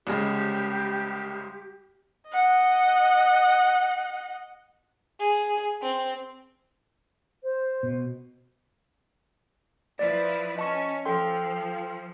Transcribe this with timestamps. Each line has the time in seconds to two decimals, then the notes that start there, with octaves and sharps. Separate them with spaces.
0.07 C2 C#3 G#3 G4
2.30 D#5 F#5
5.20 G#4
5.82 C4
7.43 C5
7.83 B2
9.99 F3 E4 B4 D5
10.57 C#4 D#5 A5 C#6
11.05 F3 A4 G5 C6